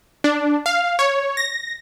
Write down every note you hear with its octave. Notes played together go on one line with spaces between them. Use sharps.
D4
F5
C#5
A#6